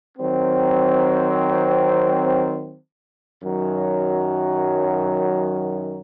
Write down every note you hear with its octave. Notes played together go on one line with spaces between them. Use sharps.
D#3 F#3 C4
F#2 D#3 F#3